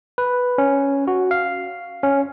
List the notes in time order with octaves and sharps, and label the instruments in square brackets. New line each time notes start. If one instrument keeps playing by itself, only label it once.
[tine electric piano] B4
C#4
F#4
F5
C#4